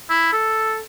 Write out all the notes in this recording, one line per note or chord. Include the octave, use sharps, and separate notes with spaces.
E4
A4